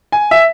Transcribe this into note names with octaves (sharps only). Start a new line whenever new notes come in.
G#5
E5